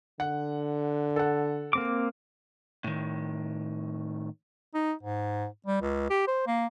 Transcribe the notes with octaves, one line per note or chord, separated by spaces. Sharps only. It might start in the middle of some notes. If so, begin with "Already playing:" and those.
D3 F#5
A4 F#5
A#3 C4 D6
A2 D#3
D#4
G#2
G3
C#2
G4
C5
A#3